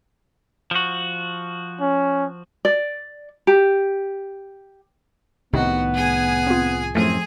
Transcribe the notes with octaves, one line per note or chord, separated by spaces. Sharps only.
F3 F#4
C#4
D5
G4
C2 A2 C3 D#3 B3 D#4 F#4
G#4 G#5
C4 F4
F#2 A2 F3 A3 C4 G#4 G#5